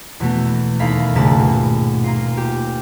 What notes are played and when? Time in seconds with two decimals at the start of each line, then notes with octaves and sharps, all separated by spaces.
0.20 E2 B2 A3 B3
0.80 D#2 A4 E5 F5 B5
1.15 D#1 G#2 C#3 A3 A5 B5
1.40 B2
2.04 A#3 F4
2.37 G4